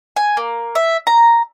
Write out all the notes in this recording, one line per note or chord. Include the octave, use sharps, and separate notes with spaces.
G#5
A#3
E5
A#5